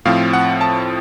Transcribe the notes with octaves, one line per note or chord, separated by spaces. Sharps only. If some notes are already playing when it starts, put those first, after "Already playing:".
A2 F3 C4 F5
F#5
A5